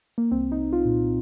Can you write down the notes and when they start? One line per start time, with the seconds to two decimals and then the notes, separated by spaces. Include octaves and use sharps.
0.18 A#3
0.31 C2 C4
0.52 D#4
0.58 C2
0.73 F4
0.85 A#2